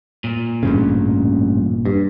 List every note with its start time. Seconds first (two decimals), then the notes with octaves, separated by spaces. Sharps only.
0.24 A#2
0.63 A1 G2 C#3
1.85 G2